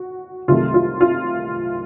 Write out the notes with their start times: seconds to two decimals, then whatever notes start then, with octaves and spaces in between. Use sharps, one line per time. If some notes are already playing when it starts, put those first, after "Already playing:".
Already playing: F#4
0.48 C2 C3 D#3 F#3 A3 F4
0.74 F4
1.01 F4